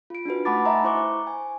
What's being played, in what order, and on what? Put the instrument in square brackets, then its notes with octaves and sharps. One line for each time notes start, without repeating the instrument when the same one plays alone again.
[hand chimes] F4 D7
D4 D#4 F#4 B4
A3 F#5 A5 B5 D6 A6
D#5 E5 G#5 A#5 C6
E4 C5 C#6 D6
G#5